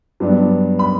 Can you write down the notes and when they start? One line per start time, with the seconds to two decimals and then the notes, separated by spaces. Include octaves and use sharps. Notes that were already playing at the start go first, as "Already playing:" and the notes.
0.20 G2 F#3 B3 D4
0.79 B5